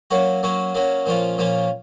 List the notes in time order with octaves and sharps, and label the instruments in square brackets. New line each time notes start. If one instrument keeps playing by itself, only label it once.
[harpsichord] F#3 A#3 C#4 F#4
F#3 A#3 C#4 F#4
F#3 A#3 C#4 F#4
A#2 F3 A#3 C#4 F4
A#2 F3 A#3 C#4 F4